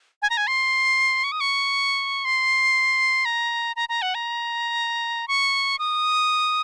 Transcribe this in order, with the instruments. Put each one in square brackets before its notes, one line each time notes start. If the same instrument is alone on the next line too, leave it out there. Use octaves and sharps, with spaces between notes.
[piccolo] G#5
A#5
G#5
C6
C#6
D#6
C#6
C6
A#5
A#5
A#5
F#5
A#5
C#6
D#6